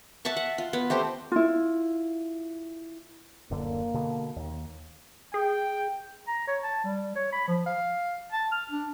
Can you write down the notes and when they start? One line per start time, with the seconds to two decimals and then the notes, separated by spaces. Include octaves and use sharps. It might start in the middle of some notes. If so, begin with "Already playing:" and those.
0.25 E5 F#5 A5 C#6
0.37 F#5
0.58 F4
0.73 B3
0.90 A3 C4 G4 C5
1.32 E4 F4
3.50 D1 F#2 D3 A#3
3.94 B2 D3
4.36 D#2
5.34 G#4 G5
6.28 A#5
6.48 C#5
6.63 A5
6.84 G3
7.16 C#5
7.33 B5
7.48 F3
7.66 F5
8.32 A5
8.52 F6
8.71 D4